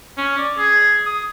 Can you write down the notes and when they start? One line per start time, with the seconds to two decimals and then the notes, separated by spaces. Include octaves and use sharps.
0.17 C#4
0.38 D5
0.58 G#4
1.06 D#6